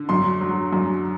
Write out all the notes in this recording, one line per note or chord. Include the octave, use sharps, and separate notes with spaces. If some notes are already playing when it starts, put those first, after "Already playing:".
Already playing: D3
F#2 C6
F#3
F#2